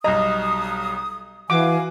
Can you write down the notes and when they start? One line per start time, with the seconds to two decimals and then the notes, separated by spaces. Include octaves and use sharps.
0.04 B1 G3 D#5 A#5 D#6
1.50 E3 F#4 F5 G#5 D6